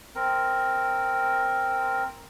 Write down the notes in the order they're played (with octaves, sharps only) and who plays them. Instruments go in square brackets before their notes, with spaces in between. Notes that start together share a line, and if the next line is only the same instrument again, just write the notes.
[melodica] C4 A#4